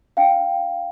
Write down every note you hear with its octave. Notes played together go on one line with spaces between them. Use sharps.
D4 F5 G5